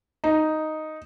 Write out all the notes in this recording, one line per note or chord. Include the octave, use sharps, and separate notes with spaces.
D#4